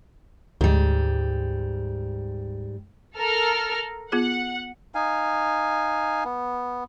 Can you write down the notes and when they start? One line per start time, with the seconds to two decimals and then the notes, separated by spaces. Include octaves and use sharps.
0.61 D2 G#2 G3
3.17 A4 A#4 F6
4.12 B3 F4 G#4 F#5
4.95 D#4 F5 G#5
6.25 B3